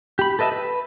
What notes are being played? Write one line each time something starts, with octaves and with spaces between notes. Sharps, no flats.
G4 B5
A4 B4 D#5 E5 A5
B4